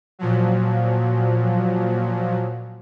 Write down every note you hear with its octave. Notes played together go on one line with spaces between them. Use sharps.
A#2 F3 F#3